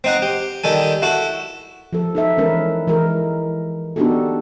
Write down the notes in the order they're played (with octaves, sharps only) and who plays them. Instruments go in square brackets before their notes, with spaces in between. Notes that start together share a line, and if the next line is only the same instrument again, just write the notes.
[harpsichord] C4 D#4 F#5
G4
D#3 G3 A4 G#5
E4 F#4 A4
[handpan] F3 A4
D#4 A4 E5
E3 G#3 C#4 A#4 B4
E3 G#3 A#4
B3 D4 D#4 F#4 G4 A4